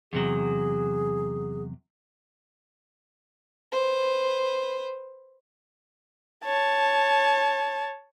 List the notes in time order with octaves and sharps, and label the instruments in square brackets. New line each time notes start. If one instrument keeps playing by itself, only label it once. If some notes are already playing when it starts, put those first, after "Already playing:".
[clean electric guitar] E2 C3 F#3 [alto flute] G#4
[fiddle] B4 C5
[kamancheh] C#5 A5